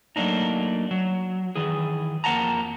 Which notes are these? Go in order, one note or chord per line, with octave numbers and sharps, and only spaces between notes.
F#3 A3 A#3 D4 D#4
F#3
D#3 E3 E4 G#4
F2 A#3 D#5 F#5 A5 A#5